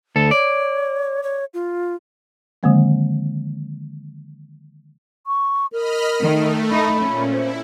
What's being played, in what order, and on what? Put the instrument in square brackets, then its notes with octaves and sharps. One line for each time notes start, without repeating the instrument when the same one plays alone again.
[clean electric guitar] D2 A4
[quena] C#5 [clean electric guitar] D5
[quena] C#5
F4
[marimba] D3 D#3 F3 G#3 A#3 C4
[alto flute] C#6
[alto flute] A#4 [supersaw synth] D#5 B5 F6
[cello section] D#3 [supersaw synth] A3
[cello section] D#4 [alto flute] B5
[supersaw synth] A#2 [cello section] C#4
[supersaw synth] E4 [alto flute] C5